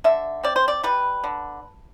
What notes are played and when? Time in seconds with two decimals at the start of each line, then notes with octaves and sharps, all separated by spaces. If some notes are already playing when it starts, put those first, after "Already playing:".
0.04 D3 E5
0.43 C4 D5
0.56 C5
0.68 D5
0.83 G3 B4
1.24 D3